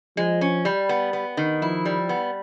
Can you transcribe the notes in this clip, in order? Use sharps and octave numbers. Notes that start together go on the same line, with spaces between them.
F3 G#3
C#4
G3
B3
B3
D#3
F3 E4
G3
B3